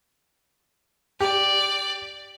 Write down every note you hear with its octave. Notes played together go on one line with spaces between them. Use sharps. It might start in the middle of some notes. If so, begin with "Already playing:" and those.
G4 D5